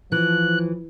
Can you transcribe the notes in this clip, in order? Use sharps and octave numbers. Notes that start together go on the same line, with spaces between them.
E3 F3 F#6